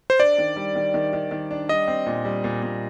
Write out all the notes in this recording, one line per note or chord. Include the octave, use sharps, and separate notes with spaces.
C5
D4 D5
D#3
G3
D#3
D#3
D#3
D#3
D4
G3 D#5
C4
A#2
G3
A#2
A#2